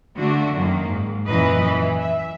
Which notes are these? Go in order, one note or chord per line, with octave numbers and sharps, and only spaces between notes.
D3 A3 D4 F#4
F#2 D#3 A#3
G#2
F#2 A#2 E3 B4 D#5
E3
E5